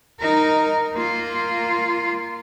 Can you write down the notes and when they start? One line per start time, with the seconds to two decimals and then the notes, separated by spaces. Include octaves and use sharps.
0.20 D#4 A#4
0.94 A#3 F4